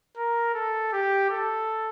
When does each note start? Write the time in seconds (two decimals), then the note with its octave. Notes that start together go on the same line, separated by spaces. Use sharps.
0.17 A#4
0.54 A4
0.92 G4
1.30 A4